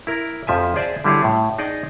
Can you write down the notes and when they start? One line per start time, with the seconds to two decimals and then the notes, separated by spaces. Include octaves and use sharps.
0.07 E4 A#4
0.47 F2 F3 E5 G#5
0.76 G#4 C5 D5 E5
1.04 D3 G3 E4 G#4 C#5
1.24 A2
1.59 D#4 G#4 D5 D#5